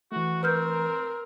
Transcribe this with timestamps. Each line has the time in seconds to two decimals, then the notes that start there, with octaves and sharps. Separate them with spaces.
0.12 E3 A3 F#4
0.43 C4 A#4 B4 F6 G6